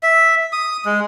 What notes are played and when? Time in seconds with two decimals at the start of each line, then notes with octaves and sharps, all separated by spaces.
0.03 E5
0.53 D#6
0.85 G#3